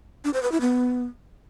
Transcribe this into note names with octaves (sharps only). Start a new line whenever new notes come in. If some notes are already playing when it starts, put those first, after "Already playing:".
D4
C5
B4
E4
B3